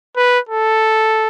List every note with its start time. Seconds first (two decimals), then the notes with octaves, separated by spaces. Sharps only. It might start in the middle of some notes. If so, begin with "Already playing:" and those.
0.17 B4
0.49 A4